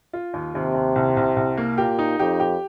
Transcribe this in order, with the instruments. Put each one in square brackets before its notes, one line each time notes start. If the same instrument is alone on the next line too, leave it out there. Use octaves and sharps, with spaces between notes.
[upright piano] F4
D#2
[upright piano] D#2 [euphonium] C3
[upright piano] D#2
C2
C2
C2
A#3
[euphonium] A#2 [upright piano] G4
[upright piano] D#4
[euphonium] F2 [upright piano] G4
[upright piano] G4